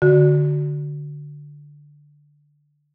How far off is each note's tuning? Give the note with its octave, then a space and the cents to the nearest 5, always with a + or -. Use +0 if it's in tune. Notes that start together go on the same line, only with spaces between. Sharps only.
D3 +0 F#4 +0